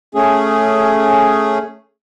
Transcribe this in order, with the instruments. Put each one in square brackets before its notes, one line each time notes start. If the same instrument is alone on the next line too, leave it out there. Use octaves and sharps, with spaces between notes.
[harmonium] A3 C#4 G#4